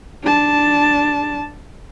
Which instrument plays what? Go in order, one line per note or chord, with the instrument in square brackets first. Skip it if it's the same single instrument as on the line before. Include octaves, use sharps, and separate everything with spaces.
[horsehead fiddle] D4 A5